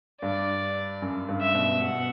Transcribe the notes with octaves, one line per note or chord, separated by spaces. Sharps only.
G2 D5
F#2
G2
E5
B2
B2 F#5